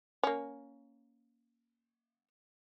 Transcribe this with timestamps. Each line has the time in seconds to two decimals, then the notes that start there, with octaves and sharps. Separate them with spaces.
0.23 A#3 C#4